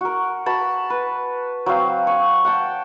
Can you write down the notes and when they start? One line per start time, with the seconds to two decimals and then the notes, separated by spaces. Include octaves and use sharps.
0.01 F#4 A#4
0.46 F#4 A5 B5
0.90 B4
1.66 F#3 C4 F5
2.07 C#5
2.45 F#5 G5 A5